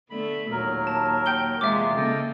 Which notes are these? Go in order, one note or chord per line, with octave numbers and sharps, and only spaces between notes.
D3 A3 B3 B5
D#2 A#2 F#3 A#4
A5
G5 G6 G7
E2 C3 G#3 F4 E5 D6
C#3 A#3 A4 D#5 G5